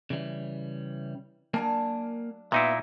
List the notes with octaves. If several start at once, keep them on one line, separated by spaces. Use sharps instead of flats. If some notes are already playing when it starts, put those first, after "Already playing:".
C#3 E3 G3
F#3 A#3 D4 A#4 G#5 A5
A#2 B3 D#4 E4 E5